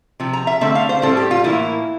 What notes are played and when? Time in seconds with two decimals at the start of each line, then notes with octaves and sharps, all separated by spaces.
0.20 C3 F3
0.33 A#5
0.47 E5
0.61 D3 A3 C4 E5
0.75 F5
0.89 C5
1.02 A2 G3 C4 A4
1.17 G4
1.31 F4
1.44 A2 E3 A#3 E4